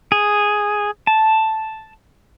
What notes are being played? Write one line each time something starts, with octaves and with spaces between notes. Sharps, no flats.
G#4
A5